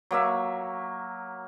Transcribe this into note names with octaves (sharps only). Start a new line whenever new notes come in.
F#3 A#3 E5